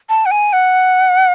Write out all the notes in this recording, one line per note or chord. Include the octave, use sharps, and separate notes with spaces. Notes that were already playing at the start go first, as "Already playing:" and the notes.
A5
F#5
G#5
F#5